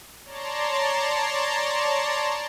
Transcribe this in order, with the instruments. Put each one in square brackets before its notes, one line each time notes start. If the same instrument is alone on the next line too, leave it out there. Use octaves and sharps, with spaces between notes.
[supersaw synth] C#5 D5 A5 A#5 C6